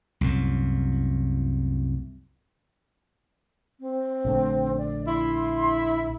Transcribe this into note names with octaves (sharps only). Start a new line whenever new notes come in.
C2 F#2 A2
C4
A#1 D3 A3
D5
E4 C6